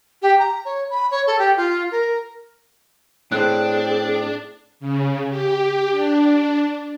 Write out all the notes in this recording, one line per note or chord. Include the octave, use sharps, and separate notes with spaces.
G4
A#5
C#5
B5
C#5
A4
G4
F4
A#4
A2 C4 D4 G#4 F#6
C#3
G4
D4